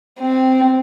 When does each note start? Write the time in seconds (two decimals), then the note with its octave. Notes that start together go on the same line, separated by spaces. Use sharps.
0.20 C4